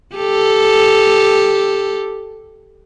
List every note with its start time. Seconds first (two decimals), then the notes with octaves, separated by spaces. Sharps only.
0.16 G4 A4